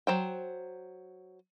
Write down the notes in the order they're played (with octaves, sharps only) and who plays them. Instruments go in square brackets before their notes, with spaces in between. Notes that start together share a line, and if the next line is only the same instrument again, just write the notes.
[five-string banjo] F#3 C5 G5